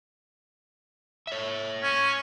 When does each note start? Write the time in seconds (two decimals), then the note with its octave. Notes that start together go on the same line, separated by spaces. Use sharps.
1.27 C#5 E5
1.83 C#4